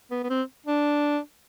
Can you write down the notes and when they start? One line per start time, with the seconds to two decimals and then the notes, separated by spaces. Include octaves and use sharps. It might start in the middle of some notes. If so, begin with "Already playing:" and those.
0.11 B3
0.23 B3
0.29 C4
0.66 D4